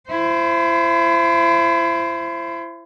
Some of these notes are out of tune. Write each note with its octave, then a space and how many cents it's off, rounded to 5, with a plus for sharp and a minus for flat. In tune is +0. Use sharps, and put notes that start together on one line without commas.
E4 +35 C5 +0